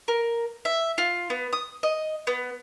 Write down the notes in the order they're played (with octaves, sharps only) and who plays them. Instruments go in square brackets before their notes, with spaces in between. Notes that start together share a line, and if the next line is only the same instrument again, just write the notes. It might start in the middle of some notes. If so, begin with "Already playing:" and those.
[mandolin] A#4
E5
F4
B3
D#6
D#5
B3